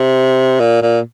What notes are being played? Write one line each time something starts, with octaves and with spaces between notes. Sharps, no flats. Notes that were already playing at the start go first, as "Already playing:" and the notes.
Already playing: C3
A#2
A#2